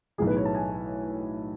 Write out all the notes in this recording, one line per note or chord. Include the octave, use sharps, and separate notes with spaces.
B1 A2 E3 G#4
B4
C#5
A5
G#5